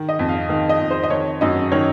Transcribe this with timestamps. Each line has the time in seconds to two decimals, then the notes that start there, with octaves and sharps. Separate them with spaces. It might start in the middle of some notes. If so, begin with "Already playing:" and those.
Already playing: D#3
0.09 D#5
0.19 F2
0.29 F5
0.49 D#3 F5
0.69 D#5
0.80 F2
0.91 C5
1.03 D#5
1.10 D#3 C#5
1.41 F#2 D#5
1.72 D#3 C#5